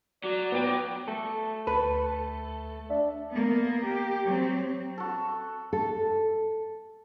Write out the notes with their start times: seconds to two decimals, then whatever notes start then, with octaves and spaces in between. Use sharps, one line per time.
0.24 F#3 D5
0.52 B3 G5 D7
1.08 A3 A4
1.67 D2 B4 A5
2.90 D4 E5
3.30 A#3 B3
3.85 G4
4.25 F#3 C4
4.98 F#4 A4
5.73 A4